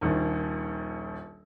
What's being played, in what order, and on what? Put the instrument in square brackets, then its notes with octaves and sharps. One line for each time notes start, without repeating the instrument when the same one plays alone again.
[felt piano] D#1 A#1 D#2